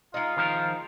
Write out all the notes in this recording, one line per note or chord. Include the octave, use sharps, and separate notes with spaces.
G#3 D#4 F4
D#3 F3 A#4